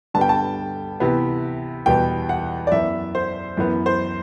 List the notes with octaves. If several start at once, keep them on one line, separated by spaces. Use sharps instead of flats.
G2 D3 G3 B3 A5
G5
A5
C3 E3 B3
E2 B2 G3 B3 G5
F#5
D5
F#2 E3 B3 E5
C5
F#2 E3 B3
C5